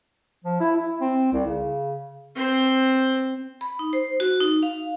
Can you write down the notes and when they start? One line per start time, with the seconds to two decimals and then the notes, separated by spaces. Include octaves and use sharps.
0.45 F3
0.60 E4
0.76 E4
1.01 C4
1.33 C2
1.47 C#3
2.35 C4 C5
3.61 B5
3.79 D#4
3.93 C5
4.20 F#4
4.40 D#4
4.63 F5